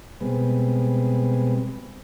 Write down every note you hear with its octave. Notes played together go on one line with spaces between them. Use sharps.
B2 G3 G#3 B3 C4